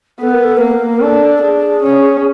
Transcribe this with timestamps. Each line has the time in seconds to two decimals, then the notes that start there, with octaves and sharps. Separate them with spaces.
0.20 B3 A4
0.31 A#4
0.43 A4
0.57 B4
0.61 A#3 A#4
1.01 D4 A4
1.36 A4
1.42 D4 G#4
1.83 C#4